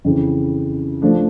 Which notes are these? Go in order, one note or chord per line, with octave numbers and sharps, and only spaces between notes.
F2 C#3 E3
F3 A3 D4